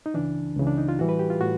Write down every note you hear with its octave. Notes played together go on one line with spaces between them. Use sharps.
D#4
C#2 C#3 E3 D4
C#2 C#3 E3
D4
D#4
F4
A2 E3 G3 F#4
B4
G4
F4
A2 F#4